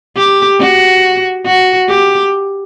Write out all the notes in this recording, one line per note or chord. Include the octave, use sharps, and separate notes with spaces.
G4
F#4
F#4
G4